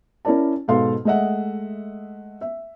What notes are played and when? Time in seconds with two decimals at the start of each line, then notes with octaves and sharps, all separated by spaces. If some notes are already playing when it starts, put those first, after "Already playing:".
0.25 C#4 E4 A#4 D5 A5
0.68 G#2 B2 A4 F5 C6
1.05 G#3 A3 D#5 E5 F#5
2.41 E5